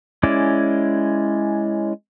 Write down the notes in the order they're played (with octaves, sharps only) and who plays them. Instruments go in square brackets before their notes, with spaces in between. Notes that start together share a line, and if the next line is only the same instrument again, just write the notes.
[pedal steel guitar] G#3 C#4 E4 D5